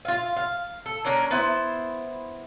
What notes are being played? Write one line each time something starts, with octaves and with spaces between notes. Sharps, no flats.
F4 F5
F5
A4
A#3 C#4 D4 A#4
B3 E4 C5